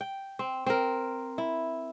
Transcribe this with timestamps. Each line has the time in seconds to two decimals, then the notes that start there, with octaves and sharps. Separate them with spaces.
0.01 G5
0.39 C4
0.66 C4 A#4
1.38 E4